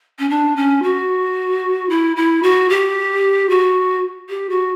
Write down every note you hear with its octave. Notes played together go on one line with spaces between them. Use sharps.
C#4
D4
C#4
F#4
E4
E4
F#4
G4
F#4
G4
F#4